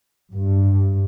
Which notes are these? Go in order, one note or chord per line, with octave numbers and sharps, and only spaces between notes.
G2